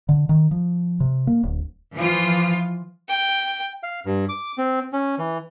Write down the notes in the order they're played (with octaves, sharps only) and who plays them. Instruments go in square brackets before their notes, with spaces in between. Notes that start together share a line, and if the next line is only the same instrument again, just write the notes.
[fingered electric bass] D3
D#3
F3
C3
A#3
D1
[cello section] E3 F3 F4
[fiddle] G5
[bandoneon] F5
G2
D6
C4
C#4
E3